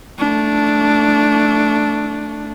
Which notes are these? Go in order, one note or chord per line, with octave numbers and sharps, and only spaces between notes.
A3 D4